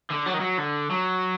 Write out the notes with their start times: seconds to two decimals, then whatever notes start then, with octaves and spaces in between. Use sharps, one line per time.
0.10 D3
0.26 F#3
0.34 D#3
0.40 F#3
0.58 D3
0.91 F#3